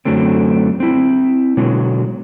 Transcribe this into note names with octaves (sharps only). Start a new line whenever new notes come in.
F#2 D3 F#3 A3 C4
C4 E4
B2 D3 F#3 G#3